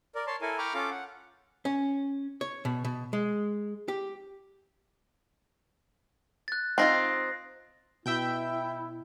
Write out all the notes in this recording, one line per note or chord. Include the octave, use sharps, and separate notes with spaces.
A#4 D5
C#5 A5 C6
E4 A4 A#4 G#5
G5 A#5 B5 C#6 D6 F6
C#4 F4 A4 F5 D6
F#5
C#4
C#5
B2
B2
G#3
G4
F#6 A6
C4 D#4 F4 A6 A#6 C7
B2 E4 E5 G5 G6